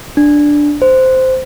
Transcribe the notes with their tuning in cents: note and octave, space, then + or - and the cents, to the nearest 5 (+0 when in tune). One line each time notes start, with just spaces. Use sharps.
D4 +0
C5 -10